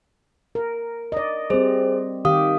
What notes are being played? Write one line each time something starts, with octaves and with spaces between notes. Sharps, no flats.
A#4
D5 D#5
G3 C4 G#4 C5
D#3 G4 F5 D#6